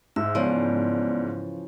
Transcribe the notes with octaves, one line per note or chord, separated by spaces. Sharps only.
G#2 E5 E6
C#3 E3 F3 B3 D5